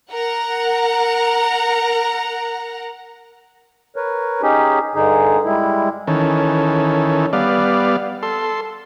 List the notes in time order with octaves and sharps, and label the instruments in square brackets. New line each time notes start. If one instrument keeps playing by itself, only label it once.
[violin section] A#4 F#5 A#5
[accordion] A#4 B4 C#5
C#4 D#4 G4 G#4
G2 D3 D#4 G#4
G3 G#3 E4
[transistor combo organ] D#3 E3 C#4 A4
G3 B3 D5 F5
A4 C6